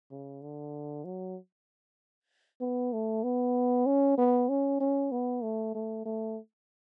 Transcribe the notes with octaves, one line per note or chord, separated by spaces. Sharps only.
C#3
D3
F#3
B3
A3
B3
C#4
B3
C#4
C#4
B3
A3
A3
A3